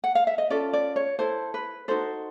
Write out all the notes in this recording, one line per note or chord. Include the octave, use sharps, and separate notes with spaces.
F#5
F5
E5
D#5
C#4 F4 A4 D5
D5
C#5
E4 A4 C5
B4
D#4 F#4 A4 C5